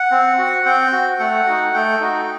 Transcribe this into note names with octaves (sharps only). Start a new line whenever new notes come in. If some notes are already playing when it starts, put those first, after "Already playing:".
Already playing: F#5
C4
F#4
C4 G5
F#4
A3 F#5
D#4 F#4
A3 G5
D#4 F#4